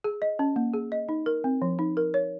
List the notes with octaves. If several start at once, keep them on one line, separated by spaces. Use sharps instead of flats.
G#4
D#5
C#4
A#3
G#4
D#5
D#4
A#4
C4
F3
D#4
A#4
C#5